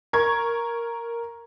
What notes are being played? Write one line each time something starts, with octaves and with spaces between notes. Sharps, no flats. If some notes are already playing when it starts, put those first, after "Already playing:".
A#4 C#6 G#6